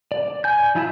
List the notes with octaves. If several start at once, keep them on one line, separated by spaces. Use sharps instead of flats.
D5
G#5 G6
F3 E4 F4 D#5 E5